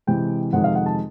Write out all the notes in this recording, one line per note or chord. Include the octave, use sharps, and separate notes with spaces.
C3 E3 G#3 G5
F2 C3 D#3 G#3 F#5
F5
F#5
A5